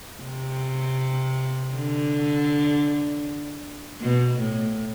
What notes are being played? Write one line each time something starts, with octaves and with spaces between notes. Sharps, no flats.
C3
D3
B2
A2